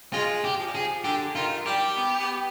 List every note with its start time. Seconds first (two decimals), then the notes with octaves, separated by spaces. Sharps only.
0.13 G#3 F4
0.44 G4
0.59 F3
0.67 G3
0.73 F3 G#4
1.04 D3 G4
1.35 D#3 F4
1.66 G3 G4
1.96 B3
2.19 B3